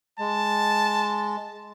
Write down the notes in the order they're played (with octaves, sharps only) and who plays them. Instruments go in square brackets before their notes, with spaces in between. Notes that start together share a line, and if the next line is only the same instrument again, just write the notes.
[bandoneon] G#3 [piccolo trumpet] A5